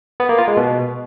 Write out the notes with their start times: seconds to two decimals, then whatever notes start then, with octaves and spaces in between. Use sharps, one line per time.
0.20 B3
0.29 A#3
0.38 F4
0.48 G#3
0.57 B2